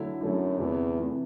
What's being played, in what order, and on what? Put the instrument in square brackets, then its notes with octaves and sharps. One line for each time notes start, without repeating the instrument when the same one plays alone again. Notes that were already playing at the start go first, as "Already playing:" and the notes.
Already playing: [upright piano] D3 F#3 A3 E4
[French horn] F#2 [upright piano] D3 F#3 A3 E4
[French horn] E2 [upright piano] C3 E3 A3
[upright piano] C3 E3 A3